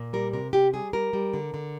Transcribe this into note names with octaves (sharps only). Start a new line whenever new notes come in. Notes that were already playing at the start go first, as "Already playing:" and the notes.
Already playing: A#2
G3 A#4
C3 A#4
C3 G4
G3 G#4
G3 A#4
G3
D3
D3